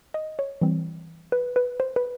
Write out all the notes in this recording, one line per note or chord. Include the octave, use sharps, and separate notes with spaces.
D#5
C#5
E3 G3 C4
B4
B4
C5
B4